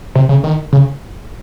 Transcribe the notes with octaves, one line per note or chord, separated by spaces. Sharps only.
C3
C#3
D#3
C#3